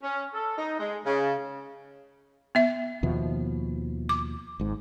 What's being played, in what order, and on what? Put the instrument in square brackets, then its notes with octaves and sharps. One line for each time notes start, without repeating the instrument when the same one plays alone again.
[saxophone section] C#4
A4
D#4
G#3
C#3
[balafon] B3 E5
[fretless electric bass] D#2 B2 F3
[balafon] D6
[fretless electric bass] G#1 G#2